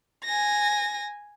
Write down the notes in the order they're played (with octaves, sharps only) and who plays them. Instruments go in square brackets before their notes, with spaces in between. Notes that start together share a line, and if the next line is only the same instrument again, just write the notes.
[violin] G#5 A#6